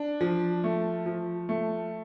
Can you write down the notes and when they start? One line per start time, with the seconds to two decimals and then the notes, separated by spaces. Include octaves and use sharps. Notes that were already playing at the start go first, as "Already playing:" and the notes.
Already playing: D4
0.21 F3
0.64 A3
1.06 F3
1.49 A3